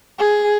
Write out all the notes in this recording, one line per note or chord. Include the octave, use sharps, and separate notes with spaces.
G#4